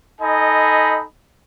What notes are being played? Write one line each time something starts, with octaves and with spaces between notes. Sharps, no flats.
D#4 A4 D#5 G#5 B5